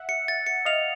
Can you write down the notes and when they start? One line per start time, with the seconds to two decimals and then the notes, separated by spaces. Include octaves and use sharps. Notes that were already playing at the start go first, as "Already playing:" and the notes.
Already playing: E5 F#5
0.09 C#7
0.28 A6
0.46 C#7
0.65 D#5 F5 F7